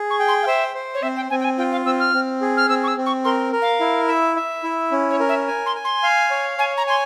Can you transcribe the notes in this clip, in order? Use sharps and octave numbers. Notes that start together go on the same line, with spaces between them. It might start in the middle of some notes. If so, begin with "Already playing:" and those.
Already playing: G#4
C#6
G5
C6
F5
C5 E5
C5
C#5
C4 E5
G5
C4 G#5
G5
G#5
F4 G5
F5
C4 E6
F6
C4
G#4
F6
C4 E6
C#6
E6
C4
C#6
A#4 C6
A#4
F5
E4
E5
E5
E4
C#4
C#5
A#4
E5
G#5
C6
G#5
C6
F5
C#5
C#5 G#5
A#5
G#5 C6